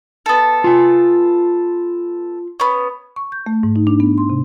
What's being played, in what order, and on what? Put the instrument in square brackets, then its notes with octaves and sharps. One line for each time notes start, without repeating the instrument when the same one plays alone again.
[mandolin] B3 A4
[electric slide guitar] F4 G#5
[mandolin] B3 C#4
[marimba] C#6
G6
A3
G#2
D#4
D4
B3
C6
C3